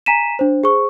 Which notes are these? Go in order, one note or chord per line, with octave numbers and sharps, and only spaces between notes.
G#5 A#5 B6 D#7 E7
D4 C5
G#4 C5 C#6